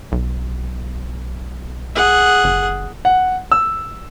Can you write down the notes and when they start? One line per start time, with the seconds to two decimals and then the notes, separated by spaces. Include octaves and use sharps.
0.12 B1
1.95 G#4 F#5
2.44 F#1
3.05 F#5
3.52 E6